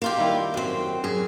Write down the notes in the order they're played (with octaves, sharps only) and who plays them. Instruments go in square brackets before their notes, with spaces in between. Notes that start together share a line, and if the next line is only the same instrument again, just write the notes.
[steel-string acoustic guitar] A#3 F4 G4
[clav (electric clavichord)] D#3 G3 E4
[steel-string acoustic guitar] F#2 C4
[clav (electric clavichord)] F#2 [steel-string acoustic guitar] G#4